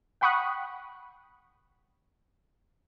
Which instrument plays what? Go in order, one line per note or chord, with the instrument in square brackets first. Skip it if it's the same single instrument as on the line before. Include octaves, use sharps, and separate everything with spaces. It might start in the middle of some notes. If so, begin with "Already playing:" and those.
[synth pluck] F#5 G5 B5 C#6 D#6 F#6